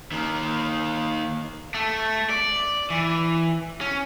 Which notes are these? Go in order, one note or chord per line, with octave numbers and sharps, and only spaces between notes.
D#3 A#3
A3
D5
E3
C#4